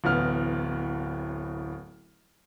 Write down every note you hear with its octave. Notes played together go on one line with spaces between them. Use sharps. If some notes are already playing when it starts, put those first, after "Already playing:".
D1 A1 B3 F6